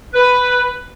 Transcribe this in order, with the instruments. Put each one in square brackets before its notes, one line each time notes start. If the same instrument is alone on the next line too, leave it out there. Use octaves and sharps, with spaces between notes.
[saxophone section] B4